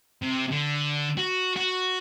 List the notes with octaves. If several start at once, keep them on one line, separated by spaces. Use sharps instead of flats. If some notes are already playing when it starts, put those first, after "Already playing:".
C3
D3
F#4
F#4